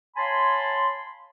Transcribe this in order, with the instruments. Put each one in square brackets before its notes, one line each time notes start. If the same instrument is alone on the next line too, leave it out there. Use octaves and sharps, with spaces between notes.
[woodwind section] C#5 F5 G#5 A5 B5 C6